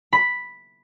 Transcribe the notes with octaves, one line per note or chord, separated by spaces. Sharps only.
B5